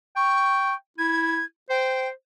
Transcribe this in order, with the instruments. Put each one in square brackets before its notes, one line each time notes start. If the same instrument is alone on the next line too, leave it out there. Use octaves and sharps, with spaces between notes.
[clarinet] G5 [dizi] C#6
[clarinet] E4 [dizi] G#6
[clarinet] C5 [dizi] G5